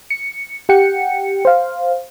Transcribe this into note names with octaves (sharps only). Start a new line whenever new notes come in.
C#7
G4 F#5 G5 C#7
C5 F5